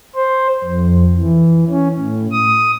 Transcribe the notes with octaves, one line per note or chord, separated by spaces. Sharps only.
C5
F2
E3
C#4
A2
D#6